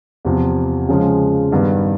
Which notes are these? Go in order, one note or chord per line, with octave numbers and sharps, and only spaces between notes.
E2 C3 F3
C#3 F3 G#3
G2 D#3 G3 B3